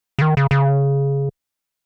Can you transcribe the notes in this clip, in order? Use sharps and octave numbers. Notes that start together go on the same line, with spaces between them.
C#3
D#3
C#3
C#3